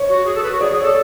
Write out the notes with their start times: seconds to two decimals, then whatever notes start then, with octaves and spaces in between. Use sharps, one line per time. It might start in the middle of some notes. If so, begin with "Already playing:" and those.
Already playing: C#5
0.09 F#4
0.25 G#4
0.35 A4
0.43 B4
0.52 F#4
0.60 G#4 D5
0.72 G#4
0.77 C#5
0.83 A4